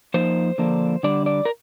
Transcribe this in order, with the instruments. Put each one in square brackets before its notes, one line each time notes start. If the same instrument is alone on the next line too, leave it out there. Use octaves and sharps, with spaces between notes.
[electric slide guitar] F3 A#3 D#4 C5
D3 F3 A#3 D4
D3 G3 D4 D5
D5
A#4